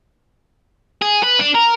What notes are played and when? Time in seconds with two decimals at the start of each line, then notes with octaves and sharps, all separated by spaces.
1.02 G#4
1.23 B4
1.39 D4
1.54 A#4